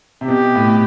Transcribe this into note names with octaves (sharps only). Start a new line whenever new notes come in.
C3
B2 G4
A2